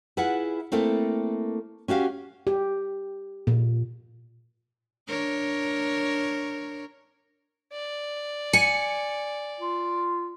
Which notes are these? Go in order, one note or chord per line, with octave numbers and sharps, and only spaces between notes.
E4 F4 G#4 B4 F#5
A3 A#3 C4 E4 A4
C#4 F#4 G4 F5
G4
A#2
D4 A#4 C#5
D5
G#5 C#7
F4